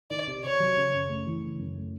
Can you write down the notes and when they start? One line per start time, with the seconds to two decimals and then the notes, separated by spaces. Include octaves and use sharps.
0.11 D#3 D5
0.27 C3
0.44 C3 C#5
0.60 F#3
0.77 C#3
0.93 F#2
1.09 A3
1.27 E3
1.43 C#3
1.59 F#2
1.76 A3